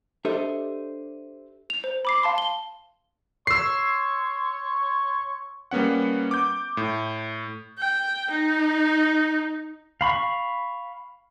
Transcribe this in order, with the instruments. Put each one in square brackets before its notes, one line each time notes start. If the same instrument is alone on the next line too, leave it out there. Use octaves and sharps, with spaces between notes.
[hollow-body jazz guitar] D4 G4 A4 C5 D#5 E5
[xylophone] F7
C5
B5 D6 C7
F5 A5 C6
G7
[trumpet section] C#5 C6 C#6 [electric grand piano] E6 C7
[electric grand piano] G3 A#3 B3 C#4 F#5
D6 G6
A2
[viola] G5
D#4
[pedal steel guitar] F5 B5 C#6